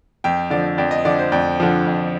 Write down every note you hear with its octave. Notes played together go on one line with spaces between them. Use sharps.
F2 G5
D3 F3 D5
F2 D5
D#5
D3 F3 D5
C5
F2 D5
D3 F3
F2